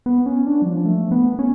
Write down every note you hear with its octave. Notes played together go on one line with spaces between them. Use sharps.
B3
C#4
D4
F#3
F3
A3
B3
C#4